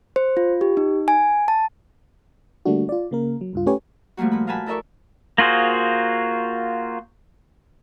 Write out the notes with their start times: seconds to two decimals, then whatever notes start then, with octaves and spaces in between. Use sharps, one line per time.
0.16 C5
0.37 F4
0.61 G4
0.77 D#4
1.08 G#5
1.48 A5
2.65 D3 G3 A3 A#3 D4 F#4
2.89 F4 D5
3.11 C#3 A#3 A#4
3.41 F#3
3.53 C#2 G2 F4
3.66 A3 C#4 G4 B4 C#5 G#5
4.17 F3 G3 A3 A#3 F#4
4.31 A#2 B5
4.47 A#4 F5 F#5 G#5 A5 B5
4.66 E4 A4 A#4 D5 E5 C#6
5.38 A#3 F4 F#4 G#4 C5